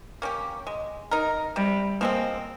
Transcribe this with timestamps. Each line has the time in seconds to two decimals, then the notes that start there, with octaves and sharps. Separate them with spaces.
0.22 A#3 C#4 G4
0.67 G#3
1.11 D#4 A#4
1.56 C3 G3
2.01 F3 G#3 A#3 C4